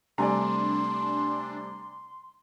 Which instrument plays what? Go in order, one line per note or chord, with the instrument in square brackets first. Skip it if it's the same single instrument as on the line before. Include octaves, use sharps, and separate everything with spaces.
[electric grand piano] C3 G3 A3 [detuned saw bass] D4 [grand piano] D5 G#5 A#5 [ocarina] C6